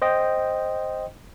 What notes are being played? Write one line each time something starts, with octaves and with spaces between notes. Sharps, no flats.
C5 D#5 G5